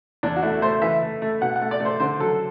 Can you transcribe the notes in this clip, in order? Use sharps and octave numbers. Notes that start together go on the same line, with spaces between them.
E2 D4
F#4
A3 E4
A3 C5
E3 E5
A3
A3
B2 F#5
F#5
A3
D5
A3 C5
D3 C5
F#3 A4